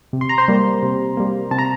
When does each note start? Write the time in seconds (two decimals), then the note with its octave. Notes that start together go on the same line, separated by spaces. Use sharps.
0.13 C3
0.21 C6
0.29 A#5
0.38 C5 C6
0.48 G3 A#3
0.83 C3
1.17 G3 A#3
1.51 C3 A5
1.58 A#5